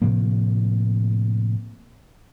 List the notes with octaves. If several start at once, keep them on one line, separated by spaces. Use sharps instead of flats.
A2 C3 F3 A#3